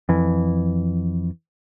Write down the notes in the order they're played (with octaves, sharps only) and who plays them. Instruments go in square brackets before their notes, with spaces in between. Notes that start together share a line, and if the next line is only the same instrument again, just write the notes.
[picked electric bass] F2 E3